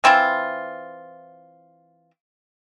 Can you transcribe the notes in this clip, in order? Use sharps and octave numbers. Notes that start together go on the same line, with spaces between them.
E3 C4 E4 F4